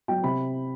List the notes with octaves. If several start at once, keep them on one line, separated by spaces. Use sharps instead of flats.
F#3 G5
C3 B5